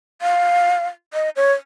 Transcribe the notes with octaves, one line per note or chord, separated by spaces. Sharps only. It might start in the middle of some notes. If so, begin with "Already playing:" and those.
F5
D#5
C#5